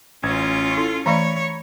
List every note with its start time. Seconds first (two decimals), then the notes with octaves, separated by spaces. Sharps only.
0.23 A1 C#4 F4 G#6
0.77 E4 A4
1.06 E3 A3 C#5 D5 A#5 B5 C#6